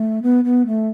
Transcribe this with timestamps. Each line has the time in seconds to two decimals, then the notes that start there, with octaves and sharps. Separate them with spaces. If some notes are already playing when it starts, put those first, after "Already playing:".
Already playing: A3
0.23 B3
0.44 B3
0.66 A3